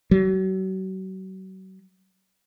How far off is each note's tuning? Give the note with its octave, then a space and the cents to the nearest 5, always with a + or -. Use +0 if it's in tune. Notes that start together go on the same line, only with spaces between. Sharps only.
F#3 +35